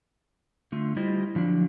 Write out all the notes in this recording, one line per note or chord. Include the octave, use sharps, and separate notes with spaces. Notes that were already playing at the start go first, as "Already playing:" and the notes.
D3 A3 F4
G3 E4 F4 G4 C5 D#5
D3 F3 F#3 D4